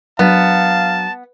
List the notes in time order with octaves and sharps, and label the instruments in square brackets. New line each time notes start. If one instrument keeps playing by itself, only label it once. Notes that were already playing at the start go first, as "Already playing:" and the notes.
[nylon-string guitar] F#3 A#3 D4 [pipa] B3 [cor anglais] F5 [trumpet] A5